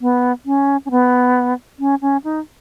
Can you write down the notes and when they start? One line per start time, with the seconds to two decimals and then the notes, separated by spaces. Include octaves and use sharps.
0.01 B3
0.46 C#4
0.86 C#4
0.91 B3
1.79 C#4
2.02 C#4
2.24 D#4